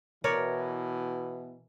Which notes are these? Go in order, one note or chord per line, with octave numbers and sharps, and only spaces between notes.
B2 E3 A#4 C#5 D5